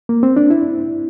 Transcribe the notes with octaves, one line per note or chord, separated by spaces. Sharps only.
A#3
C4
D4
E4